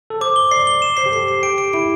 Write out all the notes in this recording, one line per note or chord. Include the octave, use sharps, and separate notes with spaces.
A4
C5 D6
G7
D5 C7
G7
E7
C5 C7
G4
A4 C7
C7
G4 D7
D7
E4 D7